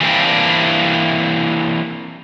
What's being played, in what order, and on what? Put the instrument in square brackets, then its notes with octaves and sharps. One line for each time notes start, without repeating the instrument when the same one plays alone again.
[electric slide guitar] E3 G3 A#3 C4 D4 E4